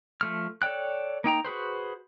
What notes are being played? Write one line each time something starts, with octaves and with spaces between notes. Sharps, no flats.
F3 A3 F6
A4 C#5 D5 G5 F#6
A#3 D#4 G5 A#5
F#4 G#4 B4 C5